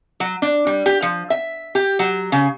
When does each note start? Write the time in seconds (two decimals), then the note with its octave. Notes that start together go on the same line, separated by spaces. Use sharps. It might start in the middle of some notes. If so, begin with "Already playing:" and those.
0.20 F#3
0.42 D4
0.67 G3
0.86 G4
1.02 F3
1.30 E5
1.75 G4
1.99 F#3
2.32 C#3